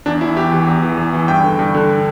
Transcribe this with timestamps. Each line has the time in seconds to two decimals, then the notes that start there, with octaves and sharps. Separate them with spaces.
0.06 E2 D4
0.21 E3 E4
0.37 E2 G4
0.51 E3
0.67 E2
0.82 E3
0.97 E2
1.13 E3
1.28 G2 G5
1.44 D3
1.59 G2
1.75 D3